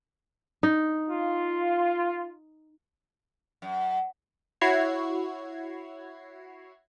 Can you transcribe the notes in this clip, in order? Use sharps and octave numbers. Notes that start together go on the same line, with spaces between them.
D#4
F4
F#2
E4 F#4 C#5 G#6 C7